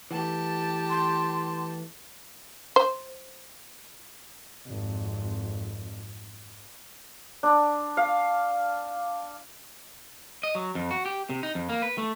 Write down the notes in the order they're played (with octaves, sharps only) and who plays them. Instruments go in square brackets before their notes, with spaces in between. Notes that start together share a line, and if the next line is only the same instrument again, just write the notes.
[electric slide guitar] E3 A3 [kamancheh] G4 A5
[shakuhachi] C6
[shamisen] C5
[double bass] G#1 F2
[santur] D4
F5
[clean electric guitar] D#5
F#3
F2
F#4
G4
C3
D#4
F2
A#3
B4
A3